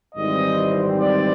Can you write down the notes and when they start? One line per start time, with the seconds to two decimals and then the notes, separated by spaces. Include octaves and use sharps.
0.15 G#1 G#2 E3 G3 C4 D#5
0.97 D5